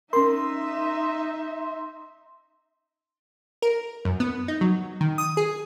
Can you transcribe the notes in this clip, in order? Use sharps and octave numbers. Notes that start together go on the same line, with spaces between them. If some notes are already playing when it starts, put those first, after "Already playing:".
C#4 D#4 A#4 E5 C6
A#4
F#2
B3
D#4
F#3
D#3
D#6
G#4